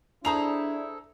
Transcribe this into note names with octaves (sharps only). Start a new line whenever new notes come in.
D4 E4 G#4 A4 C5 A#5 F7